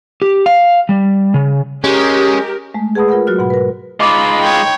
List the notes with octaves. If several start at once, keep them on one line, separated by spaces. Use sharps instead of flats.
G4
F5
G3
C#3
G#3 C#4 G4 A#4
G#3 A3
G#4 B4 F#5 A5 B5 D#6
F4 A#4 B4 F#5 B5
F#3 F#4 F6
G#2 B2 F#5 B5
A#4 B4
G#3 D#4 F4 D#5 B5 D6
C#5 G5